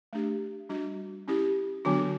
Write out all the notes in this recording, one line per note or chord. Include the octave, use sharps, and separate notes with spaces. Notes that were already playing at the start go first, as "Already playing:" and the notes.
A3 D4 G4
G3 D4 F#4
C#4 E4 G4
D3 F#3 B3 D4 F#4